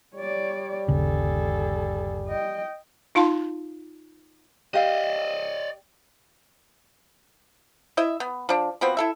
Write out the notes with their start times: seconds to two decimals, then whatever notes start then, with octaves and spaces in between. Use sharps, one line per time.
0.15 G3 C#5 D5
0.88 G1 D#2 C#3 G#4 A4
2.28 D#5 G5
3.15 D#4 F4 F5 A5 C6
4.74 G4 D5 D#5 F5
7.97 E4 D#5 E5
8.20 B3
8.49 F3 D4
8.81 F3 B3 C4 F#4
8.97 E4 A4 E5